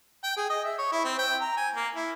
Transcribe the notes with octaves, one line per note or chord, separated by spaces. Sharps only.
G5
G#4
D#5
E5
C#5
E4
C4
G5
A#5
G#5
A#3
E4